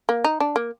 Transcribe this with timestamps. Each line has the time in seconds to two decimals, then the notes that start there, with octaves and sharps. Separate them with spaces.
0.09 A#3
0.24 D#4
0.40 D4
0.56 A#3